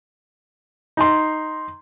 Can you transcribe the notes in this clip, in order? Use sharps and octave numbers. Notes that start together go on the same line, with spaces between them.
D#4 A#5 C6